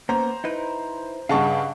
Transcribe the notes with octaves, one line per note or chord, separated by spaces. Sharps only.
A#3 B3 C#4 C5 A#5
D#4 E4 B4
G2 C#3 G#4 D#5 F5 F#5 A5 C#6